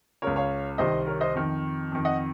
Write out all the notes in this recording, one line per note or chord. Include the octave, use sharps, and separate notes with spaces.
C#2 C#3 A#4 C#5
C#5 F5
C2 C3 D#3 C5 D#5
A#4 C#5
C5 D#5
F2 D#3
F2 D#3
D#5 F#5